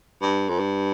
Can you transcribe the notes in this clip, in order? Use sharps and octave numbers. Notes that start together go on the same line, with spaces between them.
G2
F2
G2